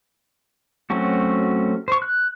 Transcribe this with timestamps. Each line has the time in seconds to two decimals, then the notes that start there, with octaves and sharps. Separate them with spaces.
0.90 F#3 A3 C4 C#4 F#4
1.88 C5 C#6
2.02 F#6